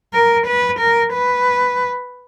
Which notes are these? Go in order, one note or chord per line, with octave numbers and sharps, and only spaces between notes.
A#4
B4
A#4
B4